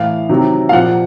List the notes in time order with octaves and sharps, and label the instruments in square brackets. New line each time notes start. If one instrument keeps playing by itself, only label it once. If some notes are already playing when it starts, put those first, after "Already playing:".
Already playing: [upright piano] A2 E3 F5
C3 D#3 F#3
F5
A#2 F3 F#5